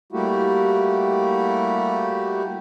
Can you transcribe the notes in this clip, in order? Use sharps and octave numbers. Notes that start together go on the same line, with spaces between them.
G3 A3 A#3 E4 F#4 G4